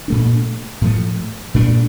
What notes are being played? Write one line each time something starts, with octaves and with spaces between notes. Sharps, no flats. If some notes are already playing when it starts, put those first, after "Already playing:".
A#2 A3 D4
A2 F3 A3
A#2 A3 D4